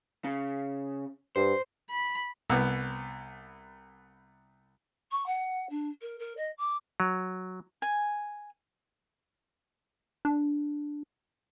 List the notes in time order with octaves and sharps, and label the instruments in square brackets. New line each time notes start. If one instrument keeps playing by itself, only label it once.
[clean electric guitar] C#3
[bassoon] G2 [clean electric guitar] C5
[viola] B5
[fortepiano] C2 B3
[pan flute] C#6
F#5
D4
A#4
A#4
D#5
D6
[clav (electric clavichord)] F#3
[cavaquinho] G#5
[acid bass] D4